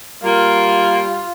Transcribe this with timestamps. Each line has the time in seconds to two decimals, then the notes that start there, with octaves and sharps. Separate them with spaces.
0.24 G3 A#3 F4